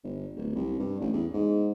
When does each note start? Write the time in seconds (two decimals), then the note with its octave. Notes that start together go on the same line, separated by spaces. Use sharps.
0.04 G1
0.36 D1
0.55 C2
0.80 G2
1.00 A1
1.13 E2
1.34 G#2